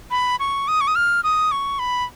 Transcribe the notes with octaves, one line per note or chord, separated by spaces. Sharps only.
B5
C#6
D#6
C#6
D#6
F6
D#6
C#6
B5